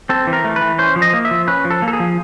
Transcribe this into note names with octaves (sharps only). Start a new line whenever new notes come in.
C4 A4
E3
A#4
A3
B4
E3
C#4 C5
F3
D#5
A#3
E5
F3
C#4 B4
F3
A4
A#3
A4
G#4
F3